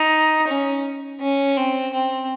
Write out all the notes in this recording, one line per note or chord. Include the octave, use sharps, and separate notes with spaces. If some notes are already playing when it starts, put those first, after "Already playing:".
Already playing: D#4
C#4
C#4
C4
C4